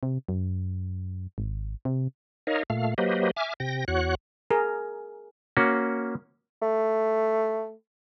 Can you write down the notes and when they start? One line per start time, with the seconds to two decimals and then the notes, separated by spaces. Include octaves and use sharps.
0.03 C3
0.28 F#2
1.38 G#1
1.85 C3
2.47 D#4 A#4 C#5 D#5 F5
2.70 A#2 A3 F5
2.98 F#3 A#3 G4 B4 C5 D#5
3.36 E5 G#5 D6 F6
3.60 C3 G5 A#6
3.88 E2 F#4 C#5 F#5 F#6
4.50 G#4 A#4
5.57 A#3 C#4 F#4
6.62 A3